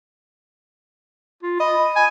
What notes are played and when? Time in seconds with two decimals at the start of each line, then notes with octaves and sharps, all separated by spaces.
1.43 F4
1.60 D#5 B5
1.96 G#5